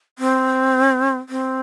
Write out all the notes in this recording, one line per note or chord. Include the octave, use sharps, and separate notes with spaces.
C4
C4